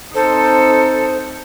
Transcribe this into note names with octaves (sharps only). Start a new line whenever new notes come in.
C4 D#4 A4 C5